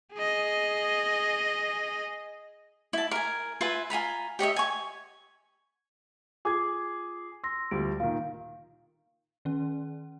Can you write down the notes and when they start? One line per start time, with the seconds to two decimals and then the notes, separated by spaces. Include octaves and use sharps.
0.14 G#4 D#5
2.93 E4 A5
3.11 A#4 G#5
3.61 F4 B4 E5 G#5
3.90 F4 G#5 A#5 B5
4.39 G4 C#5 D#5 E5
4.56 G#5 C#6
6.45 F4 G#4 D6 G#6
7.44 C6 E6 A#6
7.71 D2 F3 G3 D7
8.00 A#2 D#3 F5
9.45 D#3 C#4